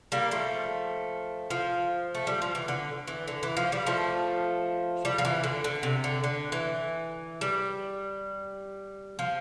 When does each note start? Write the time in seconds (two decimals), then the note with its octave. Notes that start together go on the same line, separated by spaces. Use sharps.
0.12 G3 A#3
0.31 F3 A3
1.50 F3
2.15 A3
2.27 G3
2.42 F3
2.55 E3
2.68 D3
3.08 E3
3.28 D3
3.43 E3
3.57 F3
3.72 G3
3.87 F3 A3
5.05 G3
5.18 F3
5.25 E3
5.44 D3
5.64 D3
5.83 C3
6.04 D3
6.24 D3
6.52 E3
7.41 G3
9.19 F3